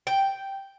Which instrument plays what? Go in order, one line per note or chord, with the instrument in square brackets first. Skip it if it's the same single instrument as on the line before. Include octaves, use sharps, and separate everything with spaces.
[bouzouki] G5